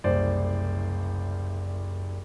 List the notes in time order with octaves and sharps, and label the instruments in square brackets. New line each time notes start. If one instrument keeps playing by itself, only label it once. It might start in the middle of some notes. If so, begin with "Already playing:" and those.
[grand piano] F#1 C2 C5 D5